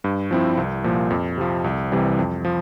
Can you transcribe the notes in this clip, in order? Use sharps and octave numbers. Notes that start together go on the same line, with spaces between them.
G2
F3 C4 E4
C2
A#2 F3
F2
C3 F3
C2
C3 E3 G3
F2
F3